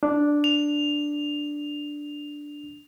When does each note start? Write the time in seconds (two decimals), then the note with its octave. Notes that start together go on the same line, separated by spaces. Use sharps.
0.03 D4
0.44 F7